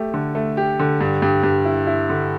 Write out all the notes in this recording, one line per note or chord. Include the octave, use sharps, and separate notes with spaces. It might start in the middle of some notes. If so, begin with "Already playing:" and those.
Already playing: A3 G4
D3
A3
G4
D3
G2
G2
G2
E4
E4
D3